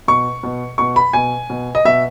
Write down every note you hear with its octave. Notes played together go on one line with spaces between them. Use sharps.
B2 C#6
B2
B2 C#6
B5
B2 G#5
B2
D#5
B2 E5